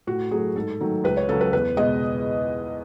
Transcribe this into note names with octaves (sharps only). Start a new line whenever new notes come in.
A2 F#4
F#3 A3 G#4
G#2 A4
D#3 F#3 A3
C#2 B4
C#5
C#3 F#3 A4
B4
E2 B4
B2 G#3 B3 D#5